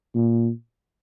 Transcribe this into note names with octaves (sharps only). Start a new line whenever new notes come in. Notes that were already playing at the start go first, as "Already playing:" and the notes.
A#2